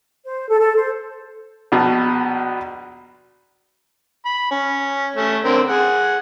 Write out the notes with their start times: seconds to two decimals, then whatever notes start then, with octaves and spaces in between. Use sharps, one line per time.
0.25 C5
0.48 A4
0.60 A4
0.75 C5
1.72 A#1 B2 A5
4.25 B5
4.51 C#4
5.16 A3 C#4
5.44 D3 C4 A#4
5.69 G#4 F#5